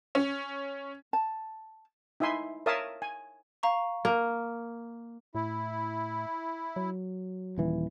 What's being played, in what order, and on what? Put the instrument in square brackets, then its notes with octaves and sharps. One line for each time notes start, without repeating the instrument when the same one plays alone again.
[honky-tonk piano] C#4
[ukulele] A5
[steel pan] D#4 E4 E5 G#5 C6
A#4 C#5 E5 F5 A5 D#6
G#5
[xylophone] F5 A#5 C#6
[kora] A#3
[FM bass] A2 [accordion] E4
[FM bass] F#3
[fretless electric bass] D#1 E3